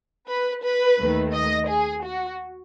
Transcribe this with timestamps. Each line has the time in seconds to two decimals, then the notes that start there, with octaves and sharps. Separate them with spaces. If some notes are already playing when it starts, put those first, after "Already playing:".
0.28 B4
0.63 B4
0.98 D#2 D#3 A3
1.34 D#5
1.69 G#4
2.04 F#4